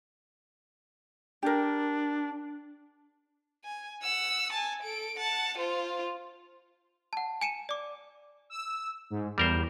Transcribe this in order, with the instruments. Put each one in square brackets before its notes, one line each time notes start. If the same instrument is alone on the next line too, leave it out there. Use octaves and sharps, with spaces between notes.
[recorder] D4 [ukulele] G4 A#4
[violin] G#5
F#5 E6
G#5 A5
A4 D7
F#5 A5
F4 C5
[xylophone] F#5 A5
G#5 C#7 D#7 E7
D5 D6
[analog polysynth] E6
G#2
[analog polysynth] E2 [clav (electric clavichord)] G3 A#4 C5